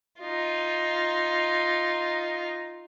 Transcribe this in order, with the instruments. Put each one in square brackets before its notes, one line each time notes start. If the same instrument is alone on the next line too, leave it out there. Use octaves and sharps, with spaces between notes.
[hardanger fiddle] D#4 F4